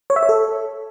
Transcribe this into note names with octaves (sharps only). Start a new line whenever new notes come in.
C#5
E5
C#5
A4